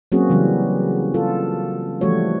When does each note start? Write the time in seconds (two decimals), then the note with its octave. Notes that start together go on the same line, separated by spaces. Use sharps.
0.12 F#3 A#3 C4 C#4 F#4 G#4
0.30 C#3 E3 F#3 G3
1.14 F4 A4
2.01 E3 F3 G3 A3 F#4 C#5